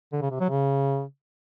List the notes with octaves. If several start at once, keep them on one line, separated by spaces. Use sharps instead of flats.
D3
C#3
C3
F#3
C#3